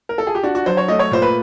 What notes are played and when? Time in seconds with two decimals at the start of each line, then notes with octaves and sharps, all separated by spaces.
0.09 A#4
0.18 A4
0.27 G#4
0.35 G4
0.43 D4 F#4
0.55 F#4
0.66 F#3 C5
0.77 C#5
0.88 A3 D#5
0.99 C#5
1.11 A#2 C5
1.22 B4